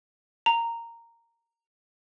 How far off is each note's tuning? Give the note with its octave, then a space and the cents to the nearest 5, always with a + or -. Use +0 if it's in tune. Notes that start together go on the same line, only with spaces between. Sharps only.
A#5 -10